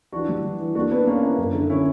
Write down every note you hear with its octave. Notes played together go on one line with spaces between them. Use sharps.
E3 D4 F#4
G3
E3
E3
A#3 D4 F#4
B3 D4 B4
A#3 C#4 B4
E4
F#2
D3
C#4 E4